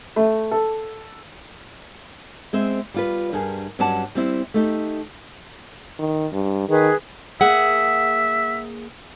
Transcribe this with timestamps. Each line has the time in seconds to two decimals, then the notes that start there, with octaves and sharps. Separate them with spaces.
0.16 A3
0.51 A4
2.53 G#3 C4 E5
2.94 G3 F4 B4
3.33 G2 G#4 A#4 G#5
3.79 G2 F#3 C#4 D5 F#5 A5
4.15 G3 C4 E4
4.54 A3 D#4 G4
5.99 D#3
6.32 G2
6.69 D#3 G#4 B4
7.41 A#3 G#4 E5 F#5